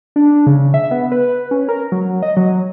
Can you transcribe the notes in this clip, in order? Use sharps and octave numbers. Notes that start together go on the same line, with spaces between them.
D4
C#3
E5
B3
B4
C#4
A#4
F#3
D#5
F#3